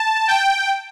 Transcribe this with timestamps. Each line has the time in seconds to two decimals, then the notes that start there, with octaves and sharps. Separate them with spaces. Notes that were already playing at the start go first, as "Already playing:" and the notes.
Already playing: A5
0.28 G5